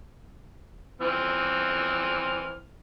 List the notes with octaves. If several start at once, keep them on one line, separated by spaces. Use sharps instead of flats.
E3 C4 F6